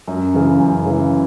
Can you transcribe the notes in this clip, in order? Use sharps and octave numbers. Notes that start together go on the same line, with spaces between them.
F#2
C#3 E3
F#2
C#3 E3